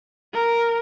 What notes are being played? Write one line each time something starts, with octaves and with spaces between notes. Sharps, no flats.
A#4